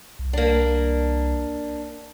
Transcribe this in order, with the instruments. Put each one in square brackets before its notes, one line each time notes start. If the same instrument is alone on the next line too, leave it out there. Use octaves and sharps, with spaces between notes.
[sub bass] C2
[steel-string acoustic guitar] A#3 D4